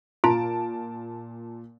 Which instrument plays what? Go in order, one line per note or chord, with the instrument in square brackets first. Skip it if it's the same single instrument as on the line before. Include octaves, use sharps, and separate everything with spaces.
[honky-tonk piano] A#2 A5 D7 [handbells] F4 A#5